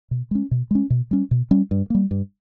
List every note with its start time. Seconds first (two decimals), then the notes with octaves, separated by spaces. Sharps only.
0.11 B2
0.31 G#3 C#4
0.51 B2
0.71 G#3 C#4
0.90 B2
1.11 G3 C#4
1.31 B2
1.51 G3 C#4
1.71 G2
1.90 G3 A#3
2.11 G2